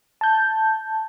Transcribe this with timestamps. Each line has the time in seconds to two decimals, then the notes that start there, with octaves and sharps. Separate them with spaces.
0.21 A5 G6